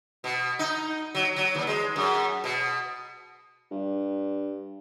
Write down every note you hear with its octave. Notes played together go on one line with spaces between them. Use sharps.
B2
D#4
F#3
F#3
D#2
G#3
F#2
B2
G2